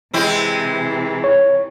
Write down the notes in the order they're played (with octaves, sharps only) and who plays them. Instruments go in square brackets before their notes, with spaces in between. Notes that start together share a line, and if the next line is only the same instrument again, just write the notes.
[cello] C3 E3 [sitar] G#3 C4 E4
[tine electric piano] C#5